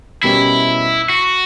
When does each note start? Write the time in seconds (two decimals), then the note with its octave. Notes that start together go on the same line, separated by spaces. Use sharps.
0.23 B2 G3 C#4 E4 G4 A#4
1.09 F#4